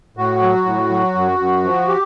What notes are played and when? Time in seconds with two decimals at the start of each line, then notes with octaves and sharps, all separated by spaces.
0.17 A2 F#4
0.41 F#3
0.65 A2
0.90 F#3
1.15 F#2
1.39 F#2
1.64 F3
1.88 G4